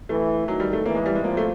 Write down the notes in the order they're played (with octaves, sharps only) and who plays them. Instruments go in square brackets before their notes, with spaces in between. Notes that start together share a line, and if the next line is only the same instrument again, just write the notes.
[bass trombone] E3 [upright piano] A3
[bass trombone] D#3 [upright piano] F#3
[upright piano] G3
A3
[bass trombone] E3 [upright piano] A#3
[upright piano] G#3
G3
G#3
[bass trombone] F3 [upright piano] A#3
[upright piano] A3